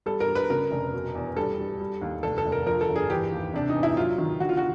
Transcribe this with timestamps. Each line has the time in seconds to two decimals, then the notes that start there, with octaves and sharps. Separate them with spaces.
0.06 G3 A4
0.20 A#4
0.28 G3
0.35 B4
0.50 C#3 A#4
0.71 F1
0.93 B2
1.15 E2
1.36 G3 A4
1.59 G3
1.80 G3
2.02 D#2
2.23 F1 A4
2.38 A4
2.45 F1
2.52 A#4
2.66 F3 A#4
2.81 A4
2.89 G1
2.96 G#4
3.10 E3 G4
3.32 D#2
3.54 C3 D4
3.69 D#4
3.75 E2
3.83 E4
3.97 F#3 F4
4.18 D#3
4.40 D3 F#4
4.49 F4
4.57 F#4